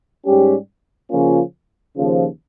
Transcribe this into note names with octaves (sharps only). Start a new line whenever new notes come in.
G#2 G3 C#4 G4
C#3 F3 A#3 C#4 F4
D#2 C#3 F3